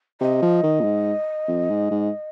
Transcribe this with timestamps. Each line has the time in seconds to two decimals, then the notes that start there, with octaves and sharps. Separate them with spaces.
0.21 C3 D#5
0.42 F3
0.63 D#3
0.80 A#2
0.84 G#2
1.48 F2
1.69 G#2
1.91 G#2